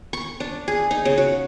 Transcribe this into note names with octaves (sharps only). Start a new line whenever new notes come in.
C#6
D4
G#4
D#4
C#3
F#4